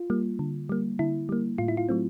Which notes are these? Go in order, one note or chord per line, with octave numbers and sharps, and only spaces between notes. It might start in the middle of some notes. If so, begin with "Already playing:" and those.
Already playing: F4
G3 A#3
D3
G3 A#3
D3 E4
G3 A#3
A2 F4
E4
F4
F#3 A3 C4